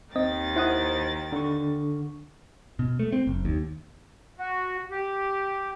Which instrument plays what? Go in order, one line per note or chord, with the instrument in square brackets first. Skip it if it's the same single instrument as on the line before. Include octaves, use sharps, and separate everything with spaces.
[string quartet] D#2 D#3 A6 [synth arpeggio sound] C4 D#5
[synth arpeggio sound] E4 F#5 D#6 [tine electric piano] C5
[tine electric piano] D3 C#6
[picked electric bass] B2
A3
C4
F#1
D#2
[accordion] F#4
G4